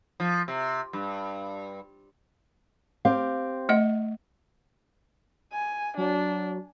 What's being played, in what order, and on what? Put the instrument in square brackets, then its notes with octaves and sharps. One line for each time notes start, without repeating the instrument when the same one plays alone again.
[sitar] F3
C3
G2
[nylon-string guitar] C4 G4 F5
[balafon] A3 D#5 F#5
[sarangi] G#5
[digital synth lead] F#3 [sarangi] D4